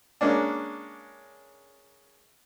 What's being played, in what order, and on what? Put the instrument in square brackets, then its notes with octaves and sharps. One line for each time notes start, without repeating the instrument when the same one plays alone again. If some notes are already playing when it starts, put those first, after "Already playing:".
[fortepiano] G#3 A#3 C#4 D4